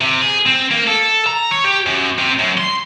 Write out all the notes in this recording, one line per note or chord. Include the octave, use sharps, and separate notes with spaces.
C3
G#4
C4
A#3
A4
A#5
C#5
G4
F#2
C3
F#2
C6